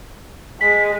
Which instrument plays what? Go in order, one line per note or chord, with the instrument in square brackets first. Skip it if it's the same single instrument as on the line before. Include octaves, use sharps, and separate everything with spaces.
[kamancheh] G#3 [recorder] B6